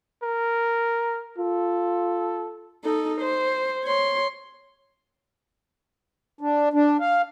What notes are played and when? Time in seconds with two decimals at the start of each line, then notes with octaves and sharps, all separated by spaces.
0.23 A#4
1.38 F4 A4
2.84 D#4 A4
3.21 C5
3.84 C#5 C6
6.41 D4
6.73 D4
7.00 F5